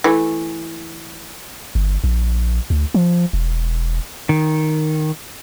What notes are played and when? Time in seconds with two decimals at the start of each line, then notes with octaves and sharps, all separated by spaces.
0.04 E3 A3
1.75 G1
2.04 A#1
2.70 D2
2.94 F3
3.33 E1
4.29 D#3